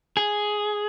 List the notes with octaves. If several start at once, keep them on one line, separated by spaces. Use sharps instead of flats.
G#4